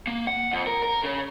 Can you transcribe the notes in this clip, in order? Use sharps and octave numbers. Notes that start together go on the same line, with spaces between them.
A#3
F#5
F2
A#4
A#4
C#3